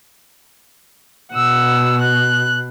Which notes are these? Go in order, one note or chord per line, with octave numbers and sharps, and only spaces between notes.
B2 F#5 E6
F#6